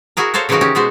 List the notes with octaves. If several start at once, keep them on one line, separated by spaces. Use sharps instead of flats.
E4 F#4 G#4 A#4
F#4 A4 C5 C#5 F5
C#3 E3 F3 D#4 F#4 A#4
C#4 D#4 G4
B2 G#3 F#4 C5